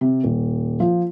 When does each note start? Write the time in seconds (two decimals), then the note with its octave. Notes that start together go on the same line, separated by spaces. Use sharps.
0.01 C3
0.23 D#1
0.80 F3